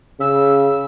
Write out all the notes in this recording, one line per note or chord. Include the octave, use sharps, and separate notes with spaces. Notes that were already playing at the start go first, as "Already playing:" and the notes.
C#3 E6